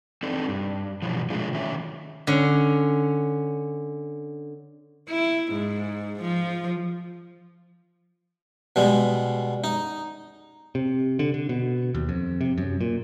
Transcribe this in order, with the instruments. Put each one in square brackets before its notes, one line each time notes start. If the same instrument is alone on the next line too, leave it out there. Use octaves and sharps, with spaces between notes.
[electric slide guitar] C4 D4 D#4 A4
G2
B2 E3 F3
A#2 D3 G#3 A3 F4
D#3 F#3 C#4 E5
[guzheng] D3 C#4
[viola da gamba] E4
G#2
F3
[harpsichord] B2 G3 G#3
D#4
[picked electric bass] C3
D3
D3
B2
D#2
F2
C3
F#2
A#2